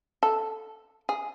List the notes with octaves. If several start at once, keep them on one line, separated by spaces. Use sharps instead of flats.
A4
G#4